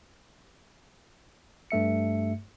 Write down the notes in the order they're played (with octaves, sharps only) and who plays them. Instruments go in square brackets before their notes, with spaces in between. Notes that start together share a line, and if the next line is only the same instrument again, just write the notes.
[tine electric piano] G2 A3 E5 C#7